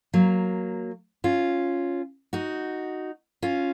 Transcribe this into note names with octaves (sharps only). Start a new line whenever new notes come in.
F#3 A#3
C#4 F4
D#4 F#4
C#4 F4